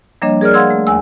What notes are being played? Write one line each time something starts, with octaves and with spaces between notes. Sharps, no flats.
F3 G3 A#3 D4 C#5 D#5
G#4 A#4 D5 F6
F5 F#5 C6 E6 G#6
A3
D#2 G#5 E6